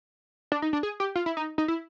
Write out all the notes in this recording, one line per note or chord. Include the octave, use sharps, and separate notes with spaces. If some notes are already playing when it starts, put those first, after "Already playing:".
D4
D#4
D4
G#4
G4
F4
E4
D#4
D#4
E4